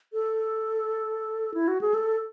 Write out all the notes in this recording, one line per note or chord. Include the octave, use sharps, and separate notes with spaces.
A4
E4
F#4
G#4
A4